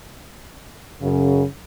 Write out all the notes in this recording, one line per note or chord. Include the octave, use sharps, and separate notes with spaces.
F#2 C#3